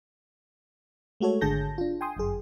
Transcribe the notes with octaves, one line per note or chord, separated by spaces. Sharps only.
G#3 A3 F#4 A4 C#5
G#1 D3 G#4 A5 G6 A#6
D4 F4
G5 G#5 C6 D#6
G1 F#2 G#4